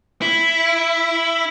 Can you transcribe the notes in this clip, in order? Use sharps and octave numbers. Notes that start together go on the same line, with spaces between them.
E4